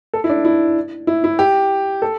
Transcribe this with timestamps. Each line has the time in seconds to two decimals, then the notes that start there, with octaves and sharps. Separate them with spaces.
0.14 A4
0.24 E4
0.30 D4
0.45 E4
1.07 E4
1.24 E4
1.39 G4
2.02 A4